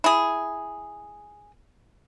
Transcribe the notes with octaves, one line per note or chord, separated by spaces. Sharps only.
E4 G#4